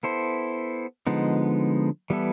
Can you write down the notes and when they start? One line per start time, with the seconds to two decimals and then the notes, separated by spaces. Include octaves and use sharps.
0.03 B3 E4 A4 C5
1.07 D3 F3 G#3 B3 D#4
2.10 E3 G3 B3 E4 A4